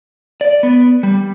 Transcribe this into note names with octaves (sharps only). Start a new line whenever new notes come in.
D5
B3
G3